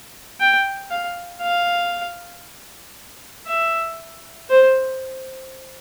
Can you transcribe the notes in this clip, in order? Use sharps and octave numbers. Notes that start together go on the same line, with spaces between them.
G5
F5
F5
E5
C5